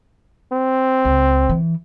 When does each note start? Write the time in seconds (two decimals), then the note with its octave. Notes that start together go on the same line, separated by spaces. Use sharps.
0.52 C4
1.05 C#2
1.49 E3